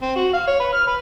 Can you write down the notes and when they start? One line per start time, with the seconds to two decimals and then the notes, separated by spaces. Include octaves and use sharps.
0.02 C4
0.15 F#4
0.33 F5
0.47 C#5
0.60 B4
0.73 F6
0.87 B4